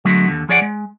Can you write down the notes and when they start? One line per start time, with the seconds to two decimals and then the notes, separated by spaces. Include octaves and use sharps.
0.05 D3 F#3 G#3 A3 B3
0.28 D#2 D3
0.49 F3 G#4 C#5 D5 F5 F#5
0.62 G#3